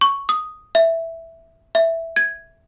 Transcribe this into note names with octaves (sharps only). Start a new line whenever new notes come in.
C#6
D#6
E5
E5
G#6